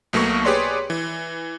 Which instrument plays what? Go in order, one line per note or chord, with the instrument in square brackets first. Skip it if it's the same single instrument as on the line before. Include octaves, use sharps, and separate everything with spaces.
[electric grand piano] B1 B2 A3 A#3 C#6
G4 G#4 B4 C#5 D5 C6
E3